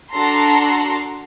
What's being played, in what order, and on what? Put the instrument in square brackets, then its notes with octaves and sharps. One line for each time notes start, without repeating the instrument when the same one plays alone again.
[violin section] D4 F#4 A4 A#5 C6